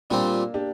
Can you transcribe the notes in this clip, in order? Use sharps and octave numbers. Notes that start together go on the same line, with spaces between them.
A#2 G3 A#3 C4 D4
D4 G4